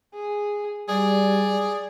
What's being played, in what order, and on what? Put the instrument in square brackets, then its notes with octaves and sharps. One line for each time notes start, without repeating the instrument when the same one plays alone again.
[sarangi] G#4
[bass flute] G3 [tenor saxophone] G#4 [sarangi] D5